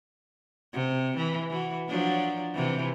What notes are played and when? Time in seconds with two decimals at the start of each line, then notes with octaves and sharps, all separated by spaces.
0.74 C3
1.17 E3
1.50 E3 F#4
1.89 F3 F#3 D4
2.54 C3 E3